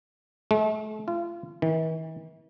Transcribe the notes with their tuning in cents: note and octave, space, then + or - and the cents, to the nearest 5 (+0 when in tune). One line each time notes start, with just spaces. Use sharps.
A3 -40
F4 -35
E3 -45